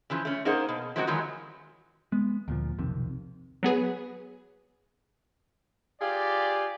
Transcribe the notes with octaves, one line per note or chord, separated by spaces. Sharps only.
C#3 E3 F3
A3 C#4
A#3 D#4 G#4 A#4 C5 F#5
B2
F3 G#3 A#3 C4 D4 F#4
D#3 E3 F#3 G#3 F4
G#3 B3
D2 A#2 F3
B1 F2 C3 D#3
F#3 B3 G#4 B4
F4 G4 G#4 D5